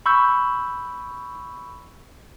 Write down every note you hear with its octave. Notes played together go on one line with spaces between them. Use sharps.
B5 C#6 E6 G6